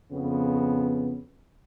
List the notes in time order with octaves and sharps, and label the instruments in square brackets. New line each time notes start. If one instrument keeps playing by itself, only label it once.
[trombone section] F2 C#3 B3